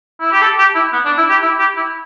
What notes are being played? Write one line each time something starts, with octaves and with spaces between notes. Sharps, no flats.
E4
G4
A4
G4
E4
B3
D4
E4
G4
E4
G4
E4